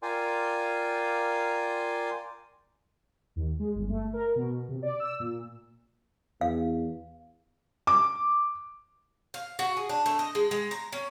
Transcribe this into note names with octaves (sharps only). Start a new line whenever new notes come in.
F4 A#4 D5 G5 G#5 C6
D#2
G#3
G1
A3
A#4
B2
C3
D5
E6
A#2
E2 F5
D6
F5
F#4
G#4
D4
A3
D#5
G#3
G#3
A#5
C#4